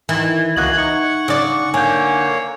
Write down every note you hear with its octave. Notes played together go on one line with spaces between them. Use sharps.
D#3 E3
C#2 A#3 F#4 D#5 F#6 G#6 F#7
D#4 F#5 C#6
C#3 D5
D3 A#3 C#5 G#5 G6